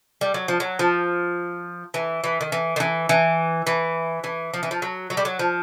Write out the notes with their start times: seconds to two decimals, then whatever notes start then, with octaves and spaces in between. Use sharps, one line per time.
0.21 G3
0.34 F#3
0.48 F3
0.60 F#3
0.79 F3
1.94 E3
2.24 E3
2.41 D#3
2.52 E3
2.76 D#3
2.80 E3
3.09 E3
3.67 E3
4.24 E3
4.54 F3
4.63 E3
4.71 F3
4.82 F#3
5.10 F#3
5.17 G3
5.25 F#3
5.39 F3